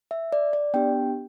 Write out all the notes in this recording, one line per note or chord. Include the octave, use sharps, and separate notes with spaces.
E5
D5
D5
B3 D4 G4 G5